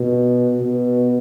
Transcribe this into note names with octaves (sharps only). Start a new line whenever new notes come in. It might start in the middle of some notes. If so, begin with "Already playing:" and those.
Already playing: B2
B2